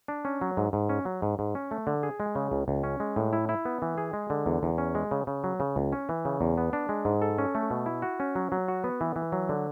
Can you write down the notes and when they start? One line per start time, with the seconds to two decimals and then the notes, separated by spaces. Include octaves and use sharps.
0.08 D4
0.25 C#4
0.41 F#3
0.57 G#2
0.73 G#2
0.89 C#4
1.05 F#3
1.22 G#2
1.39 G#2
1.55 C#4
1.71 A3
1.87 D3
2.03 G#4
2.20 G#3
2.35 C#3
2.52 C#2
2.68 C#2
2.84 C#4
3.00 G#3
3.16 A2
3.33 E4
3.49 E4
3.65 B3
3.82 E3
3.98 G#4
4.13 G#3
4.30 D3
4.46 E2
4.63 E2
4.78 C#4
4.95 G#3
5.11 C#3
5.27 C#3
5.44 F#3
5.60 C#3
5.76 C#2
5.92 C#4
6.09 E3
6.25 C#3
6.41 E2
6.58 B3
6.73 D4
6.89 G#3
7.05 G#2
7.22 A4
7.38 C#4
7.55 A3
7.71 B2
7.86 E4
8.02 F#4
8.20 C#4
8.36 F#3
8.52 F#3
8.68 F#4
8.84 B3
9.01 E3
9.16 E3
9.32 F#3
9.49 D3